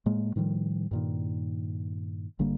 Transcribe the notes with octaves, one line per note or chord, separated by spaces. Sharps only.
A2 G#3 A#3
A2 D#3 F3 G3
G2 A#2 D#3
G#1 D3 G3 A#3